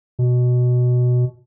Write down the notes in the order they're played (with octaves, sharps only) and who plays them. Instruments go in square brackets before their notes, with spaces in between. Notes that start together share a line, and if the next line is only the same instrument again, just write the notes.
[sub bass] B2